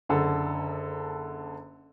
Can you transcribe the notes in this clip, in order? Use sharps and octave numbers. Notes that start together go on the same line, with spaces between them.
F#1 D3 A4